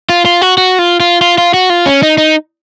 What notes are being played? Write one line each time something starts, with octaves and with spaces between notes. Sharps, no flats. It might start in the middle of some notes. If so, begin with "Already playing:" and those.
F4
F4
F#4
F#4
F4
F4
F4
F4
F#4
F4
C#4
D#4
D#4